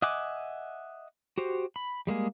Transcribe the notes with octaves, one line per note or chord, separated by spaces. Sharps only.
D#5 E5 F#5 G#5 D6
F#4 G4 C5
B5
G3 G#3 A#3 G#4